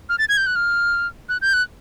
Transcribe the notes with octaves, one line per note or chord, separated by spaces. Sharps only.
F6
A6
G#6
G6
F#6
F6
F#6
G6
F#6